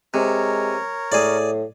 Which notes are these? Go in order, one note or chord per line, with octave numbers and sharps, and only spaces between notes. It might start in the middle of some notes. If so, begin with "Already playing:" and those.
C3 G#3 A#4 C#5
A2 G#4 D5